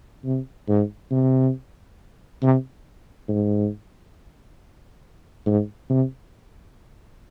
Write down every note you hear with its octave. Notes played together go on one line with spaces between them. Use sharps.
C3
G#2
C3
C3
G#2
G#2
C3